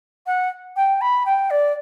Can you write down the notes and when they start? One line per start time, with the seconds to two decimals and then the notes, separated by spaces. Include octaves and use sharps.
0.26 F#5
0.76 G5
1.01 B5
1.26 G5
1.50 D5